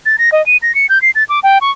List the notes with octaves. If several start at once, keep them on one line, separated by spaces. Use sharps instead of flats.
A6
A#6
D#5
D#7
A#6
C#7
G6
C7
A6
D6
G5
C#6